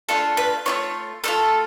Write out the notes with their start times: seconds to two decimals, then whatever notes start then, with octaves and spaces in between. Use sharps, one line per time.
0.09 A3 D4 F4 A4
0.37 B4
0.66 A3 D4 F4 C#5
1.24 A3 D4 F4 A4